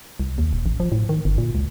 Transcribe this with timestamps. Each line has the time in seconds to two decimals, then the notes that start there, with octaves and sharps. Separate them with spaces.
0.20 C2
0.38 D#2
0.53 D#1
0.66 A1
0.80 F3
0.92 A2
1.09 D#3
1.25 G1
1.38 A#2
1.55 C#2